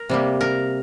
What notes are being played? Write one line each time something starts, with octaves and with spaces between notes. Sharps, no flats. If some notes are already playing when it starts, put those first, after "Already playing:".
Already playing: A#4
C3 G3 A#3
A#4